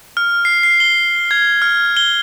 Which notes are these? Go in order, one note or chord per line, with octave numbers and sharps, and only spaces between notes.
F6
C7
C7
G7
G#6
F6
G7